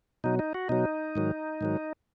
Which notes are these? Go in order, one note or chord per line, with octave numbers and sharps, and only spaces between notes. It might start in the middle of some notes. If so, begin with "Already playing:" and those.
B2 F#3 D#4
D#4
F#4
B2 F#3 D#4
G#2 D#3 F#3
G#2 D#3 F#3